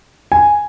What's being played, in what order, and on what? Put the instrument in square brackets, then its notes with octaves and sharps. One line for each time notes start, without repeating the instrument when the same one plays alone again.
[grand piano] G#5